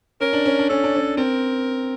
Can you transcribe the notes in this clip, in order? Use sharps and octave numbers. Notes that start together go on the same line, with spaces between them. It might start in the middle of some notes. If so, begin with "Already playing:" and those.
C#4 A#4
D4
C#4
D4
C#4 A4
D4
C#4
C4 A#4